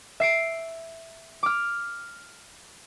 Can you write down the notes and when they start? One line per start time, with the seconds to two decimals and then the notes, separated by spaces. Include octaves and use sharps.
0.20 E5 C7 D7
1.43 D6 F6